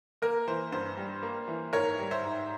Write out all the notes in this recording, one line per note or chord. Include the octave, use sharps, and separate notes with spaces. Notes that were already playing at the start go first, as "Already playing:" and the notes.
A#3 A#4
E3 C5
G2 C5
G3
A#3
E3
G#2 A#4 C#5
G3
C5 E5
G#2